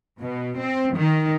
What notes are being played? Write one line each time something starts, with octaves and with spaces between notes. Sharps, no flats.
B2
C4
D#3